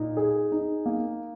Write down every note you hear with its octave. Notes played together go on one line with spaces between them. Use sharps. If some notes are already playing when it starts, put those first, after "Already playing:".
Already playing: A#2 D#4
G#4
D#4
A#3